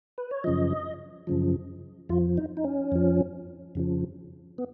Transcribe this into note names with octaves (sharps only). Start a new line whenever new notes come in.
B4
C#5
F#2 C#3 F3 D#5
F#2 C#3 F3
F2 F3 F4
D#4
D#4
C#4
F2 F3
F2 C#3 F3
B3